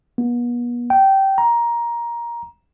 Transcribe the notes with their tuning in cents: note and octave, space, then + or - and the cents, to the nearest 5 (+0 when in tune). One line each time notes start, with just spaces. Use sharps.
B3 -40
G5 -15
A#5 +15